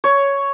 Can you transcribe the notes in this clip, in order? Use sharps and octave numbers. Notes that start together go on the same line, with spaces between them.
C#5